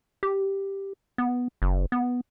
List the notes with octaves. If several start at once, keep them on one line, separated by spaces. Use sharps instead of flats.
G4
B3
F#1
B3